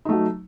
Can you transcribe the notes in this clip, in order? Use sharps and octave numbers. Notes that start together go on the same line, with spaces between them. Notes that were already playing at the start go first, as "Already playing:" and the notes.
F#3 A3 D#4